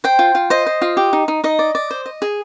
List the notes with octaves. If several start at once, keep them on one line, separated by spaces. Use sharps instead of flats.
C5 G5
F4
F4
C5 D#5
C5
F4
G4
D#4
D#4
D#4 D#5
D5
D5
C5
D#5
G#4